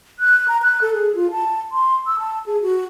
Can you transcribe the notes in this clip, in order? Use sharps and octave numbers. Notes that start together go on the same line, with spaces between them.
F#6
A#5
F#6
A4
G#4
F4
A5
C6
E6
A5
G#4
F#4